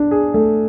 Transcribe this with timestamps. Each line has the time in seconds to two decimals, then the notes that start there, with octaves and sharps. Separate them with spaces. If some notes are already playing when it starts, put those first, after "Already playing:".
Already playing: D4
0.11 G#4
0.34 A3